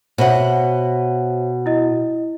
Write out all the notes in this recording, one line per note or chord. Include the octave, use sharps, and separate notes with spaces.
B2 C5 C#5 E5 F#5
E4 D#5